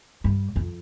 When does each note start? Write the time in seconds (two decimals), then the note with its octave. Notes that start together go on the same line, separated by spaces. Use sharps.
0.24 G2
0.56 F2